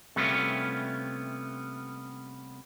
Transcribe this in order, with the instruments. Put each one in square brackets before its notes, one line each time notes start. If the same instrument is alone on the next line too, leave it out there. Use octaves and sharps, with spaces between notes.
[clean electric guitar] C3 G3 A3 B3 C#4 F4